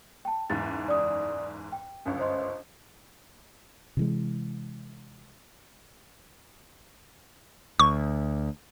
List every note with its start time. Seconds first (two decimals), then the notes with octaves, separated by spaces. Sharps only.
0.25 G5 A5
0.50 F#1 E2 G#2 A6
0.88 D5 D#6
1.72 G5
2.05 G1 C#2 F#2
2.19 C5 D#5 C6
3.97 C3 E3 G#3
7.79 D2 C#6